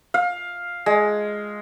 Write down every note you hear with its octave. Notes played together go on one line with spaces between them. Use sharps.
F5
G#3